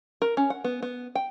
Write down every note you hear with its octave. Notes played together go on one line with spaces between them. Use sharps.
A#4
C#4
F#5
B3
B3
G5